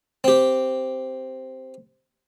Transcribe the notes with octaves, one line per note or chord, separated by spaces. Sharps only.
C4 G4